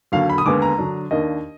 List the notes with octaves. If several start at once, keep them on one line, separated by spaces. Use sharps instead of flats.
D#2 D3 F#3 F5
B5
D#6
D#2 D3 G#3 B3 D6
A#5
D3 F#3 D4
D#2 D#3 A#3 D4 D#5